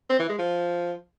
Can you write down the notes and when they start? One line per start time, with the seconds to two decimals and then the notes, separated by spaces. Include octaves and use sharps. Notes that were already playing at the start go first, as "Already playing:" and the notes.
0.10 C4
0.20 E3
0.29 G#3
0.39 F3